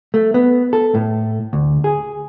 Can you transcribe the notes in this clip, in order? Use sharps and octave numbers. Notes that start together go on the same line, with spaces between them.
A3
B3
A4
A2
D2
G#4